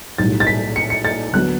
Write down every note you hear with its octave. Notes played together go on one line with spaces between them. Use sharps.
B1 A2 G3 A6
A6
B6
C#7
C#7
A6
D2 D3 F#3 B3 F#6